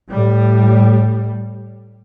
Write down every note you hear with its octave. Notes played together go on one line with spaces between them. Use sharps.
A2 G3